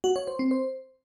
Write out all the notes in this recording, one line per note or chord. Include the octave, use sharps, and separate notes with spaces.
F#4
C#5
C5
C4
C5